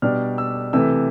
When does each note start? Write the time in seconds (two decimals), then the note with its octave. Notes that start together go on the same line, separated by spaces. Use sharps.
0.02 B2 G3 D4 F6
0.38 E6
0.73 C3 E3 A3 E6